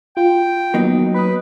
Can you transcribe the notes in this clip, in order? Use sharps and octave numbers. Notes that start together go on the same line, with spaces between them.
F4 G5
F#3 A#3 B3 D#4
B4 B5 D#6